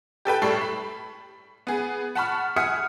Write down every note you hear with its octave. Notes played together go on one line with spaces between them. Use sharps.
G4 A4 B4 G5
A2 G3 A4 B5 C#6 C7
B5
B3 G#4
F#5 A5 B5 C#6 F6
E5 F#5 G#5 D#6 F6 C#7